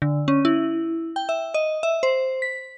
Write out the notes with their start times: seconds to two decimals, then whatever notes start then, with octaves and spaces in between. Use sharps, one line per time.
0.02 D3
0.28 C#4
0.45 E4
1.16 G5
1.29 E5
1.54 D#5
1.83 E5
2.03 C5
2.42 B6